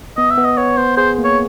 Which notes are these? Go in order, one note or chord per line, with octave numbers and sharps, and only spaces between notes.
B3 D#5
E5
B3
D#5
B3 C#5
B3 C5
G#4 C5
A#3
C#5